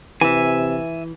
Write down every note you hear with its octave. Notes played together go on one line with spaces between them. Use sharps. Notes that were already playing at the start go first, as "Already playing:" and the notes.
C3 E3 E5 G#5